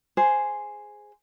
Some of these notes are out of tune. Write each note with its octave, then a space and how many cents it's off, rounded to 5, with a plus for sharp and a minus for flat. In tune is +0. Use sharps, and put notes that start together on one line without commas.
G#4 +0 C5 +0